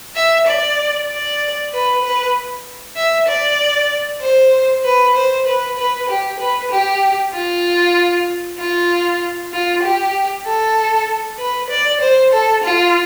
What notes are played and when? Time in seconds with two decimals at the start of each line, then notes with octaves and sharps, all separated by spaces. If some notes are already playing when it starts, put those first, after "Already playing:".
0.16 E5
0.47 D5
1.09 D5
1.73 B4
2.03 B4
2.96 E5
3.28 D5
4.21 C5
4.84 B4
5.15 C5
5.46 B4
5.78 B4
6.09 G4
6.39 B4
6.71 G4
7.34 F4
8.58 F4
9.53 F4
9.83 G4
10.46 A4
11.39 B4
11.70 D5
12.01 C5
12.33 A4
12.63 F4